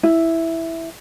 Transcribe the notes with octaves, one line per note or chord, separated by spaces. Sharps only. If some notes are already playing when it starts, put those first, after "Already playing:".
E4